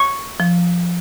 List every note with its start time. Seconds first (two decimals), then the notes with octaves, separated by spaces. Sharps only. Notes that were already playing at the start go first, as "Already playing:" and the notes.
Already playing: C#6
0.40 F3